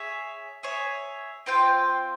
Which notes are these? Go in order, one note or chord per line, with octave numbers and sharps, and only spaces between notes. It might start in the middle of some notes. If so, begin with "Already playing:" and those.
Already playing: G#4 C#5 E5
G#4 C#5 E5
C4 F4 C5 G5